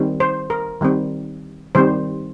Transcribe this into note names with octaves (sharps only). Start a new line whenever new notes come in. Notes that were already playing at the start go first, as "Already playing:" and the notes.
Already playing: D#3 G3 C4
C5
A#4
D#3 G3 C4
D#3 G3 C4 C5